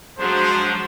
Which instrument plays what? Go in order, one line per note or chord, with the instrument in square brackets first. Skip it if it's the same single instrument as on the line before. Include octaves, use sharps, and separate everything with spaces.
[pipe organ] F3 D4 [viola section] F#3 G#3 [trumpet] C5